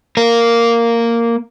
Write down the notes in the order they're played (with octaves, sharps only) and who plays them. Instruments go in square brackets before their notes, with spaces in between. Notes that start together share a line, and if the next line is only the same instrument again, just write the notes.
[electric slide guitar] A#3 A#4